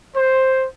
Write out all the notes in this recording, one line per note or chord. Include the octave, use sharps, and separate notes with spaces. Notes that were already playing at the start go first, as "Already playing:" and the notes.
C5